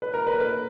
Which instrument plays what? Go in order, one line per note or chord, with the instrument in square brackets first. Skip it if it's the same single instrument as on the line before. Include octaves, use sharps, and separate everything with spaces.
[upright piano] B4
A#4
B4
B4